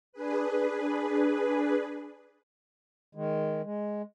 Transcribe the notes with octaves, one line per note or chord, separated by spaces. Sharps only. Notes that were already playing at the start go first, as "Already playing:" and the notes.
D4 G#4 B4
D#3 G#3
G#3